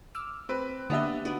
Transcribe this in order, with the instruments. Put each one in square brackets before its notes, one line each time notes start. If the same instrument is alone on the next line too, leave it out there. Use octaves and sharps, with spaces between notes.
[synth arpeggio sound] D6 E6 F6
[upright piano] C4 B4
[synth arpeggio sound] D3 A#3 G4 [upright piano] B3 D4 E5
[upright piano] B3 [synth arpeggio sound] D4 D#4 F#4